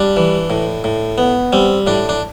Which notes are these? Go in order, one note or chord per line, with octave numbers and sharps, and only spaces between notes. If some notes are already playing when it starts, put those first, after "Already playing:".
Already playing: G3 D4
E3
A2
A2
B3
G3 C4
A2 D4
D4